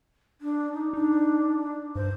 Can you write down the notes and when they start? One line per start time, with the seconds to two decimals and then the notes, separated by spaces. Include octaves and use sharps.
0.41 D4
0.73 D#4
0.93 D4 D#4
1.95 G2 C5